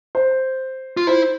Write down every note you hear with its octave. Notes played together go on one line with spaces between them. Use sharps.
C5
F4
E4 C5